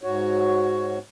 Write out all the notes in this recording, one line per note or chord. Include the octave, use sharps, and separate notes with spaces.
G#2 F#4 C#5